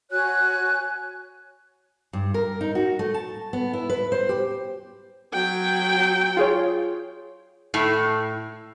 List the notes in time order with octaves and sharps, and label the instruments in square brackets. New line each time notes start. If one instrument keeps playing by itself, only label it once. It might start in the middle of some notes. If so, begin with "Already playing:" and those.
[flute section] F#4 C#5 G#5 F#6
[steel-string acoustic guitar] G2
A#4
D#4
F#4
A3
A5
B3
E4
B4
C5
G4
[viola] F#3 G5
[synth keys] F4 G#4 C#5
[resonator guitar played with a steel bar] A2